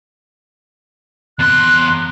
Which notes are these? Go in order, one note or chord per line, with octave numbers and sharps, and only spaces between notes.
E2 C6 F#6